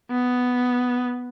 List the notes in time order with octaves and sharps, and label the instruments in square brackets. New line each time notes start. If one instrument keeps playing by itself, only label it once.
[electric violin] B3